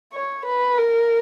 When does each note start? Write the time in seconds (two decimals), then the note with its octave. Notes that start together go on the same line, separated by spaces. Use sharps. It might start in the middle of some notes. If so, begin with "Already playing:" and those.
0.13 C#5
0.45 B4
0.78 A#4